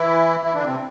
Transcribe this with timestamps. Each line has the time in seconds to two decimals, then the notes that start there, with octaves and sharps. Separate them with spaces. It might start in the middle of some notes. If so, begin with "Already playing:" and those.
Already playing: E3 E4
0.43 E3 E4
0.54 D3 D4
0.65 C3 C4